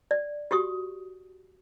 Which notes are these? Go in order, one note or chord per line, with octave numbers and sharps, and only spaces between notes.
D5
F#4 G4 C#6 D#6